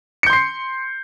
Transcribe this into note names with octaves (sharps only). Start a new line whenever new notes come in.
C6 G6 C7 C#7